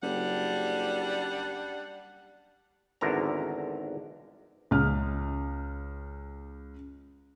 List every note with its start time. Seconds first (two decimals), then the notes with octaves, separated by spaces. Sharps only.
0.03 F#1 G3 D4 F#5
3.01 G#1 E2 D3 A#4 A#5
4.71 C#2 F6